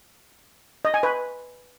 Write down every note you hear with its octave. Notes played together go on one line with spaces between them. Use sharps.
D#5
G#5
B4